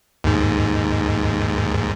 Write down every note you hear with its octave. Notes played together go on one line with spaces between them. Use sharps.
D#2 G#2